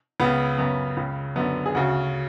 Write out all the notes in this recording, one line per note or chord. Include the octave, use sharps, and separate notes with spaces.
C#2 C#3 B3
F#2 C#3 B3
C#2 C#3
F#2 D3 B3
G#4
D2 C#3 F#4